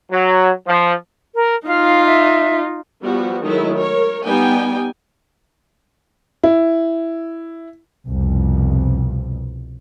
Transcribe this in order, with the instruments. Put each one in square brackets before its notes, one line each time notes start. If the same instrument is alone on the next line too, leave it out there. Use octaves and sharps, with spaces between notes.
[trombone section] F#3
F3
[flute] A#4
[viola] D#4 F4 [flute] F5
[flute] E5
[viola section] F3 G3 B3 F#4
D#3 F#3 G#3 A3 D#4 E4
A#4 C#5
G3 B3 D#4 G5 G#5
[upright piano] E4
[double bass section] C2 F2 B2